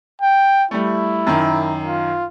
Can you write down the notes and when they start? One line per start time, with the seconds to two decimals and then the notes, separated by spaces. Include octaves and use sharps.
0.22 G5
0.71 G3 A3 E4
1.27 F#2 D#3
1.85 F4